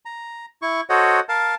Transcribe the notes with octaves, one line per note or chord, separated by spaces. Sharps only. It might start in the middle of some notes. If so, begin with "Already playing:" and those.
A#5
E4 C#6
F#4 A4 C5 C#5 D#5 F#5
A#4 F5 A5